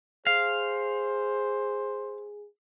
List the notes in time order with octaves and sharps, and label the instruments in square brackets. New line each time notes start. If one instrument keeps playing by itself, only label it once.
[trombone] G#4 [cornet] C5 [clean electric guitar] F5